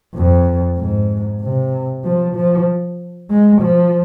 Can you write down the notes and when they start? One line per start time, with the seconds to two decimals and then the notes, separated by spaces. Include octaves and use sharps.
0.15 F2
0.78 G#2
1.42 C3
2.04 F3
2.36 F3
3.31 G#3
3.62 F3